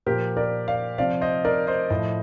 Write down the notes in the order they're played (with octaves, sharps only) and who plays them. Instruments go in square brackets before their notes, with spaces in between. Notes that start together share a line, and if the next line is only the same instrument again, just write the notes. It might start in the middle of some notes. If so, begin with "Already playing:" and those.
[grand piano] A#2 F3 G4 A#4
A#4 D5
D5 F5
C3 F3 D5 F5
C5 D#5
A#4 D5
C5 D#5
A2 F3 C5 D#5